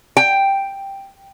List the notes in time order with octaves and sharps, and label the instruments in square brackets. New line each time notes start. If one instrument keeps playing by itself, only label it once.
[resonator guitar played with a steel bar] G5